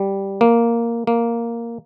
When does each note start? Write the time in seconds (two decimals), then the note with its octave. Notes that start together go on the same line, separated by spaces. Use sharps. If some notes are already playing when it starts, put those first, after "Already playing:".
Already playing: G3
0.41 A#3
1.07 A#3